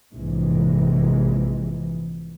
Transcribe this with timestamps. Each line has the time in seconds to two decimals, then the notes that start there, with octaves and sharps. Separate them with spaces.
0.14 A#1 G#2 C3 E3 G#3